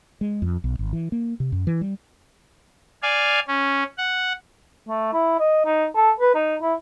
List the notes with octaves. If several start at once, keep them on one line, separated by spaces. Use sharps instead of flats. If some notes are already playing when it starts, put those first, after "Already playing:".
G#3
F2
B1
G#1
E3
A#3
C3
F#2
E3
G3
D5 F5 G#5
C#4
F#5
A3
E4
D#5
D#4
A4
B4
D#4
E4